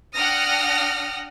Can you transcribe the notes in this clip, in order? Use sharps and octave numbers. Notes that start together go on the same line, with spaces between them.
D4 F#5 G5 D#6 F6 A#6